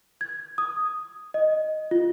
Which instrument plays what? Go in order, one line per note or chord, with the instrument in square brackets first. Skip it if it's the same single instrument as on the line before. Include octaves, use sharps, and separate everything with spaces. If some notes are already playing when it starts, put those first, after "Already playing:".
[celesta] G#6
D#6
D#5
F4